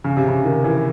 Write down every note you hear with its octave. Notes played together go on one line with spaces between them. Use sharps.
C#3
C3
C#3
D#3
E3